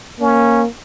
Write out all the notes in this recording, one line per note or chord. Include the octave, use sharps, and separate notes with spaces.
A#3 C#4